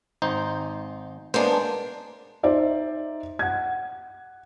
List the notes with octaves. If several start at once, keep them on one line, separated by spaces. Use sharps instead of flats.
G#1 D#4 C5
G#3 A#3 B3 D4 C5
D#4 C5 D5 E5
F#5 G#6